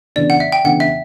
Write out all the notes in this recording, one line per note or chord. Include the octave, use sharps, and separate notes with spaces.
C#3 E3 B3 D4 D5
F#5
E5
G5
C#3 E3 B3 D4 F#5
E5